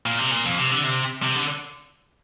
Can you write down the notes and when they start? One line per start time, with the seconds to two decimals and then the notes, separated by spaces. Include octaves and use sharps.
0.06 A#2
0.19 C3
0.31 A#2
0.45 F2
0.58 C3
0.71 D3
0.84 C3
1.23 C3
1.36 D3